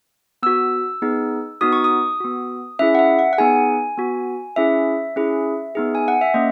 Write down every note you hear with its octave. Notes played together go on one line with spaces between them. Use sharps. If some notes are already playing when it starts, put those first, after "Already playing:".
B3 F#4 E6
B3 D#4 G#4
B3 D#4 F#4 D#6
C#6
D#6
B3 F#4
C#4 E4 G#4 E5
F#5
E5
F#5
F#5
B3 D#4 G#4 G#5
B3 F#4
C#4 E4 G#4 E5
C#4 E4 G#4
B3 D#4 G#4
G#5
F#5
E5
A#3 C#4 D#5